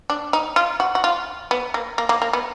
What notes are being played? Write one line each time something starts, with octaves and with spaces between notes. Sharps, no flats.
D4
D#4
F4
F#4
F#4
F4
B3
A#3
A#3
A#3
A#3
B3